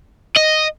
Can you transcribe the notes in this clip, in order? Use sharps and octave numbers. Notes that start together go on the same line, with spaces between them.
D#5